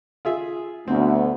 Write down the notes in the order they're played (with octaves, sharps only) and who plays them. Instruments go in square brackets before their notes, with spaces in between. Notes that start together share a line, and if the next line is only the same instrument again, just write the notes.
[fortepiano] F4 G#4 E5
[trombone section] D2 [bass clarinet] B3 [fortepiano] C4